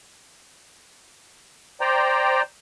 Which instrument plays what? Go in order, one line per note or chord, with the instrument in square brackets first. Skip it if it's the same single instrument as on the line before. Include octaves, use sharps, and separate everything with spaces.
[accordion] C5 D5 G5 A#5